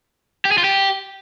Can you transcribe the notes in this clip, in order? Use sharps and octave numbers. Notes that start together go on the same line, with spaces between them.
G4
G#4
F4
G4